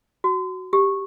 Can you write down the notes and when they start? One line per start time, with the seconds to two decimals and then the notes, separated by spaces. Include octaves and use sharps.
0.24 F#4
0.73 G4